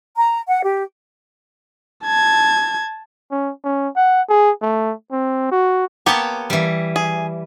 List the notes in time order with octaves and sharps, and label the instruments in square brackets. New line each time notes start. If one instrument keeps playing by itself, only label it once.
[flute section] A#5
F#5
G4
[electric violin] A5 G#6
[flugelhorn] C#4
C#4
F#5
G#4
A3
C4
F#4
[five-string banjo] A#3 B3 G4 [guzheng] C#5 A5
[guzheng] E3 G3
[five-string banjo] G#4